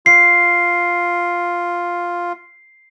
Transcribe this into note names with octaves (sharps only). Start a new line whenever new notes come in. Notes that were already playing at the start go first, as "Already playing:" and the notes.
F4 C7